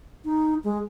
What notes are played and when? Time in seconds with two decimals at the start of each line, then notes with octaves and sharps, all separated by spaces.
0.25 D#4
0.64 G#3